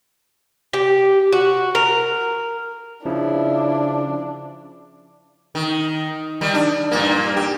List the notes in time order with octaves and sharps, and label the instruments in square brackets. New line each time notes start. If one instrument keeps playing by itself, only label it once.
[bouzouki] G4
F#4
A#4
[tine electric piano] C#3 F3 [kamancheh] D4 [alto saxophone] E4
[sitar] D#3
D#3 G3
D4
G2 A#2 A#3
G4